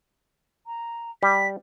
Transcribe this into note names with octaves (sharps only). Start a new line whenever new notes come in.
A#5
G3 B6